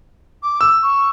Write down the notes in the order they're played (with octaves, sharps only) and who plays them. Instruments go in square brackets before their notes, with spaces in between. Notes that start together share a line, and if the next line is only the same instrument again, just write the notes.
[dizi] D6
[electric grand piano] E6
[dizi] C#6